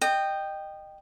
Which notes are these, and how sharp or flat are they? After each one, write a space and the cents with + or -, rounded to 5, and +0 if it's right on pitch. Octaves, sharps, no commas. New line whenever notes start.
D#5 -20 G5 +0